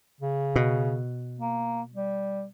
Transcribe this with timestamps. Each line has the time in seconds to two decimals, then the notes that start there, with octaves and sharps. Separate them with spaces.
0.20 C#3
0.56 B2
1.39 A#3
1.94 G3